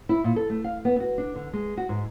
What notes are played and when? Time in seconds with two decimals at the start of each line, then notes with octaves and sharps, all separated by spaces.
0.09 E4
0.24 A#2
0.36 A4
0.50 A3
0.64 F5
0.85 B3
1.00 F#4
1.18 D4
1.36 D3
1.53 G#3
1.77 F#4
1.89 G#2